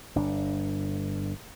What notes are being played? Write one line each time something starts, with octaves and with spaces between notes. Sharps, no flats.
G1 D4